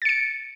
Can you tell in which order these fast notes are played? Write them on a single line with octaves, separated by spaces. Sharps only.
A6 C#7 D7